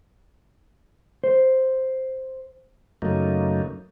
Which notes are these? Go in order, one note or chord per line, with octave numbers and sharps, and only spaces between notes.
C5
F#2 C#3 F#3 A3 A#3 D#4